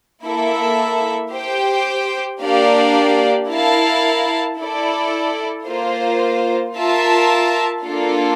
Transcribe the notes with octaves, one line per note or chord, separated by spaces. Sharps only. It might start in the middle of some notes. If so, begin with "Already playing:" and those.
A#3 E4 A4 E5
G4 C5 G5
A#3 D4 G4 D5 F5
E4 A#4 F5 A5
E4 A4 D5
A#3 F4 C5
F4 A#4 E5 A5
A#3 D4 F4 A4